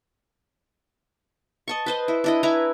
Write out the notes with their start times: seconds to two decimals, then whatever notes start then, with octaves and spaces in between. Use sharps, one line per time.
1.68 D#5 A5 C#6
1.86 B4 C5 D#5
2.08 E4
2.24 D4 E4 D#5
2.43 E4 B4 G#5 A#5